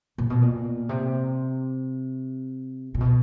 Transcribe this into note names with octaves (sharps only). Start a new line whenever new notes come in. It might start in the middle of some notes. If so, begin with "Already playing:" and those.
A#2
B2
A#2
C3
A#2
B2